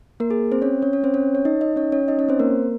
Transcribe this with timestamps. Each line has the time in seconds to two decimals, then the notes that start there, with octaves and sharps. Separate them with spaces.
0.20 A#3 A#4
0.30 G#4
0.52 C4 C5
0.62 C#4 C#5
0.82 C#4 C#5
0.93 C#4 C#5
1.04 C4 C5
1.14 C#4 C#5
1.35 C#5
1.45 D#4 D#5
1.61 D#4 D#5
1.76 C#4 C#5
1.92 C#4 C#5
2.08 D#4 D#5
2.19 C#4 C#5
2.29 C4 C5
2.39 A#3 A#4